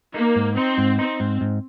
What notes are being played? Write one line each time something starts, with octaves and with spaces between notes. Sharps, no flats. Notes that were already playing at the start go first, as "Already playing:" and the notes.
A#3 D#4
G#2
C4 D#4
G#2
C4 D#4
G#2
G#2